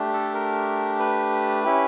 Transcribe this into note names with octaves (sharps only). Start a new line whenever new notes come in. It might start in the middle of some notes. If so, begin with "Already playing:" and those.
Already playing: A3 D4 G4
A4
A#4
B4
C#4 E4 G4